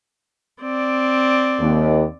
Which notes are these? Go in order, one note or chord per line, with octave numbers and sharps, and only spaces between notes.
C4 D5
D#2